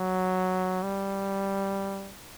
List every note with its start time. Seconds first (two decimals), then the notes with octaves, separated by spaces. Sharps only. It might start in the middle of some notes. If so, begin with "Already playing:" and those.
Already playing: F#3
0.83 G3